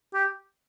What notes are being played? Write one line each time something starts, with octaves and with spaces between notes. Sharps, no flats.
G4